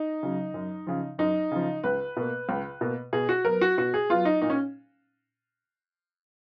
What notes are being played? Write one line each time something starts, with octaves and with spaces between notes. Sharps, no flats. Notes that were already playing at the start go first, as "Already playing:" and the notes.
Already playing: D#4
C#3 F#3
F#2
C#3 F3
F#2 D#4
C#3 F3
C#2 B4
B2 A#3
C#2
B2 A#3
B2 G#4
F#4
F#3 B3 A#4
F#4
B2 F#4
G#4
F#3 B3 F4
D#4
A#2 D#4
C#4